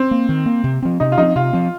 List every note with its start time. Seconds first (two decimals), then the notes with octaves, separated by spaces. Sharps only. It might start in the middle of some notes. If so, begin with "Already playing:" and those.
Already playing: C4
0.11 A#3
0.29 D#3
0.46 A#3
0.64 C3
0.82 F3 C4
1.00 C3 D#4
1.12 F4
1.18 F3 C4 D#4
1.35 C3 F4
1.53 F3 C4